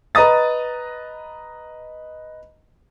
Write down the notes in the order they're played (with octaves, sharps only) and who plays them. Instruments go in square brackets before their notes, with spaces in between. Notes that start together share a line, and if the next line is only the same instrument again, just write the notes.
[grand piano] B4 D#5 A#5 D#6 A6